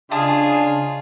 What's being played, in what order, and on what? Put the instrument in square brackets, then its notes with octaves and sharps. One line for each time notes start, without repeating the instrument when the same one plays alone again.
[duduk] C#3 [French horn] D4 [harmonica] F4 G#4 [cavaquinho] D#5 A5 D#6